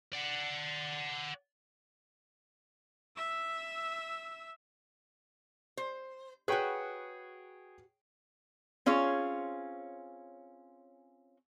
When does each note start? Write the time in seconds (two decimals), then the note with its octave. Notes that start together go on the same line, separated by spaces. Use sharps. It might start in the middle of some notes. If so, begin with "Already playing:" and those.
0.13 D5 F#5
3.16 E5 E6
5.77 C5
6.48 F#4 G#4 B4 C#5 G5
8.86 C4 C#4 F4 G#4 C#5